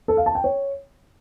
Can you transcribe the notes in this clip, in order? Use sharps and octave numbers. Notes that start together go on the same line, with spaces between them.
A4
F5
A5
G5
C#5